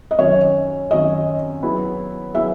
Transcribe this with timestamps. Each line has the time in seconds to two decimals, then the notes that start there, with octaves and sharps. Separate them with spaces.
0.11 D#5
0.19 F#2 D#3 F#3 C#4 C#5
0.91 F#2 D#3 F#3 C#4 D#5
1.63 F#3 B3 E4 G#4
2.34 F#3 B3 E4 G#4 E5